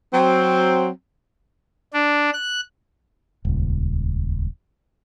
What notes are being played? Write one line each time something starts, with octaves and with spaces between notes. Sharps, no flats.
F#3 C4
D4
F#6
D#1 C#2